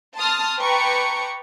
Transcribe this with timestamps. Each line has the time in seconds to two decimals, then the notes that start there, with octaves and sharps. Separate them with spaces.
0.16 A5 C6 D#6 F6
0.59 B4 G5 A5 A#5 C#6 D6